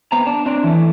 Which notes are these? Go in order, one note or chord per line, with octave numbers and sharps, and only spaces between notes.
B3 C4 A#5
D4
C4 D4
E3 A3